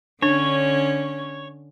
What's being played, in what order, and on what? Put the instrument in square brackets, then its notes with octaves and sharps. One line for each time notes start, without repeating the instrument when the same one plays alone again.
[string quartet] D3 C#4 [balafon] D4 [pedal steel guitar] C#5